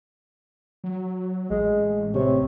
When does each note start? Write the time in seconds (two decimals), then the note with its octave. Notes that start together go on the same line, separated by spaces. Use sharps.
0.84 F#3
1.50 A1 G#3
2.14 C3 C#5